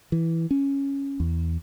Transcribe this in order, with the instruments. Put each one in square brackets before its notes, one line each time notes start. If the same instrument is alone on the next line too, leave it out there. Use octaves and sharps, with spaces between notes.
[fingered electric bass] E3
C#4
E2